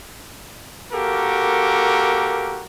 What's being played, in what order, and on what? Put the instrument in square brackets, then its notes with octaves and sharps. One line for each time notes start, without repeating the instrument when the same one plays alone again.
[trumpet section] A#3 F#4 G4 A4 A#4